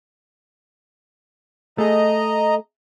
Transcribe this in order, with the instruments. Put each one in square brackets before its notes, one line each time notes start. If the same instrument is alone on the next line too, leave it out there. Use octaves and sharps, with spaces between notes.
[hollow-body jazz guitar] A3 G#4 [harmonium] D#5 A#5